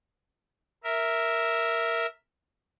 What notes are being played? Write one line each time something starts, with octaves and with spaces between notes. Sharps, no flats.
A#4 E5